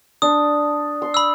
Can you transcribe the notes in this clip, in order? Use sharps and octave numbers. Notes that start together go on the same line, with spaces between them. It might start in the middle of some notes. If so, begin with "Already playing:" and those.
D4 D#6
C6
B5 E6